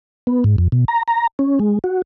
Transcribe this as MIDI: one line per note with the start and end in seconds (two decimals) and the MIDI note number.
0.27 0.44 59
0.44 0.56 44
0.58 0.68 41
0.72 0.85 47
0.88 1.03 82
1.08 1.27 82
1.39 1.59 61
1.60 1.79 56
1.84 2.02 66